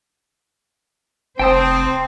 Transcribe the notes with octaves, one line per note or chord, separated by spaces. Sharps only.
F1 C4 C5 G5 A5 D#6